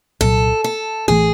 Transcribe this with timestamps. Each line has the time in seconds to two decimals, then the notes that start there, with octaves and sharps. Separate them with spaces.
0.21 C2 A#2 F#3 A4
0.64 A4
1.08 A1 E3 A3 G#4